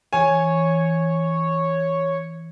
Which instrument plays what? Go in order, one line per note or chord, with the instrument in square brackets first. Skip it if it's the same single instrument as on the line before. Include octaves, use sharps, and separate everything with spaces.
[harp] E3 [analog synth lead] C#5 [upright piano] G#5